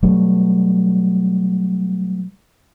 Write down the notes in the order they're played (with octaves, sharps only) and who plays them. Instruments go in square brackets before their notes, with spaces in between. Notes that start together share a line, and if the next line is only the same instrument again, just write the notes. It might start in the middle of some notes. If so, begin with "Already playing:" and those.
[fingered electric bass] B2 F#3 G3 A3